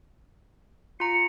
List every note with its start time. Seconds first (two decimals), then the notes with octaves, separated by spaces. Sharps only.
1.00 F4 A#5 C#7